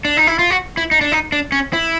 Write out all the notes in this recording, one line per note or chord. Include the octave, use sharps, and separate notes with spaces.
D4
D#4
E4
F4
F#4
E4
D#4
D4
D#4
D4
C#4
E4